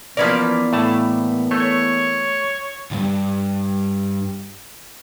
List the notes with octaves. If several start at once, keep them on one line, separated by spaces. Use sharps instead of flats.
E3 F3 A#3 B3 C#4 A#4 B4 D5
A2 A3 A5
A3 C#5
C2 G2